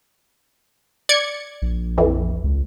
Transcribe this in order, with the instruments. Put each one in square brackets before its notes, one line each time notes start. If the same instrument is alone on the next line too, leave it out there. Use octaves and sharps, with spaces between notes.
[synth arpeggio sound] D5 G#6 C#7
[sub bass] A#1
[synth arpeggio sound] F2 E3
[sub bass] C#2